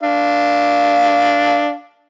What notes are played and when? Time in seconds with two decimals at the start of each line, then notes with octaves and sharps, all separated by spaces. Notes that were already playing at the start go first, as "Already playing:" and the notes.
0.03 D4 F5